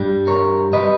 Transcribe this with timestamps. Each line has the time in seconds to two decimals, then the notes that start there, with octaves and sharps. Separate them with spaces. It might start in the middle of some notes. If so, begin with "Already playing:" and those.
Already playing: G2 G3
0.27 A#4 C#5
0.73 G3 B4 D#5